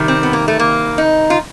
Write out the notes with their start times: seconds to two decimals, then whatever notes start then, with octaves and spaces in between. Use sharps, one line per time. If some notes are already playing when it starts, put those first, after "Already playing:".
Already playing: C3 D#3 G3
0.08 C4
0.23 B3
0.33 A#3
0.48 A3
0.59 A#3
0.98 D#4
1.30 F4